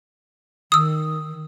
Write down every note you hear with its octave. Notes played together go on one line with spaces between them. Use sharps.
D#3 D#6 E6